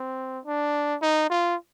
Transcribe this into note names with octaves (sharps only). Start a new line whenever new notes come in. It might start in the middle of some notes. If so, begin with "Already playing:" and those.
Already playing: C4
D4
D#4
F4